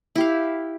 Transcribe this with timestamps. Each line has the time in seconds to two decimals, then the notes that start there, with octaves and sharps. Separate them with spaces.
0.15 E4
0.18 G4
0.21 F5